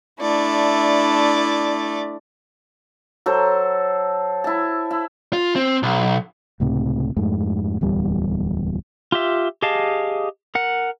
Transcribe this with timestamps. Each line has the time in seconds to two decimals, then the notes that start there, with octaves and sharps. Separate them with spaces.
0.20 A3 D4 E4 D5
3.26 F#3 A4 C5
4.44 E4 A5
4.91 E4
5.33 F4
5.56 C4
5.83 B1
6.60 C#2 A2 C3
7.17 F2 G#2 A3
7.81 D1 E2 G3
9.12 F4 G4 E5
9.62 G4 G#4 D#5 F5 A5
10.55 A#4 F#5